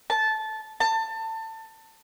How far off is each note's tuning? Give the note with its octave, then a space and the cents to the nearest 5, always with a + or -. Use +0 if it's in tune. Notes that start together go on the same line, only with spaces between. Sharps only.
A5 -15
A5 +25